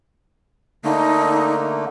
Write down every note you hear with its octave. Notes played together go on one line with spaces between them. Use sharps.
D3 A3 A#3 D#4